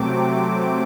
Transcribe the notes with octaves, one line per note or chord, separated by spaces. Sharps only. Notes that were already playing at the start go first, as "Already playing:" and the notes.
Already playing: C3 F#3 A3 C4 D6